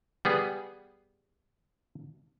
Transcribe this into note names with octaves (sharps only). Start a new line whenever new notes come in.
G3 B3 G#4